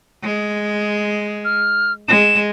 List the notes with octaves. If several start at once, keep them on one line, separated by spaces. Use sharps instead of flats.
G#3
F6
G#3 E7